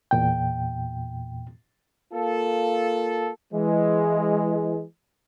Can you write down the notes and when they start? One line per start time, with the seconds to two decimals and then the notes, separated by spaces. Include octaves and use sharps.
0.11 E2 A#2 G5
2.13 A#3 F4 A4
3.52 E3 G#3